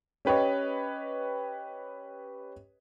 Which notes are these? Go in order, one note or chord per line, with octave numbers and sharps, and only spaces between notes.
C#4 G4 B4 C#5 D#5